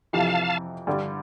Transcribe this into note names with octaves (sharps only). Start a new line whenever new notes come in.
F2 C3 E3 F5 A5
G2 D3 G3